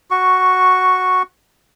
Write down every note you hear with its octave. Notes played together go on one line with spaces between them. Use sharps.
F#4 C#6